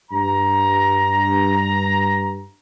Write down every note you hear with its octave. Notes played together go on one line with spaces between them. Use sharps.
G2 A#5